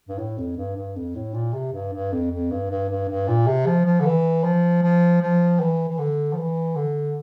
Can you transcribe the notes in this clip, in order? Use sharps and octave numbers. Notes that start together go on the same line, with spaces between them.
G2
A2
F2
G2
G2
F2
A2
A#2
C3
G2
G2
F2
F2
G2
G2
G2
G2
A#2
C3
F3
F3
D3
E3
F3
F3
F3
E3
E3
D3
F3
E3
D3